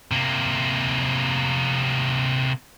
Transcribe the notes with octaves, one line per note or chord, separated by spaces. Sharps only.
C3 A#3